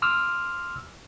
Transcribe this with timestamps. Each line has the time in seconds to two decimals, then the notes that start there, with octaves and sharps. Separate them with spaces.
0.02 C6 D6 E6 F6